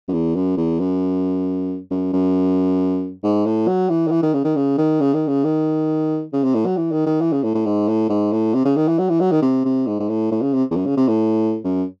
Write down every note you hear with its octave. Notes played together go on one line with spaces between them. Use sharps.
F#2
E2
F#2
E2
F#2
F#2
F#2
G#2
A2
F#3
E3
D#3
E3
D#3
C#3
D#3
C#3
D#3
C#3
D#3
C#3
D#3
C#3
C3
A2
F#3
E3
D#3
D#3
E3
C#3
A2
A2
G#2
A2
G#2
A2
C3
C#3
D#3
E3
F#3
E3
F#3
D#3
C3
C3
G#2
G#2
A2
A2
C#3
C3
E2
F#2
C#3
C3
A2
F#2